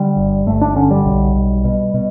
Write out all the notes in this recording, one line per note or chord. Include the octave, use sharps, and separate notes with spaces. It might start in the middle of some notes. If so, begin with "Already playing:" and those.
Already playing: D3 G3
G1
G1 A3
D4
D3 C#4
G3
B1
B1
B2
B2